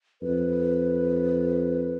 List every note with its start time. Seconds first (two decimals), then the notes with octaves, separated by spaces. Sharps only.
0.22 F2 B4